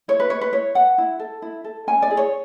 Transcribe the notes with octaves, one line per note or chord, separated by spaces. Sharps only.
E4 C#5
B4
B4 C#5
B4
E4 C#5
B4 F#5
E4
A4
E4
A4
C#4 G#5
D5
E4 G#4
C#5